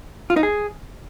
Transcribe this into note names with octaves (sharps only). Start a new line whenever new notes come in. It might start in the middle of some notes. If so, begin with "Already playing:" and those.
F4
D#4
G#4